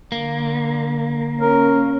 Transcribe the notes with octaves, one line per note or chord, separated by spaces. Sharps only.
D3 A#3
C#4 A#4